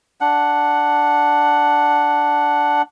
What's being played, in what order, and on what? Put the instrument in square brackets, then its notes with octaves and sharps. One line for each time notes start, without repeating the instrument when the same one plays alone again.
[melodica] D4 F#5